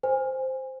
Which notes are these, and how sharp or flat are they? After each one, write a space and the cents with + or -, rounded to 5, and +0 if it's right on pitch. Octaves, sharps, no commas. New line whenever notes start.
C5 +0 G#5 -25